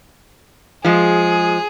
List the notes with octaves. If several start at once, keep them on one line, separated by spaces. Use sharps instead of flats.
F3 G#3 G#4